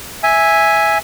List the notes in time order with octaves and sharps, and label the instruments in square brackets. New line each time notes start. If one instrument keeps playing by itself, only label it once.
[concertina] E5 G#5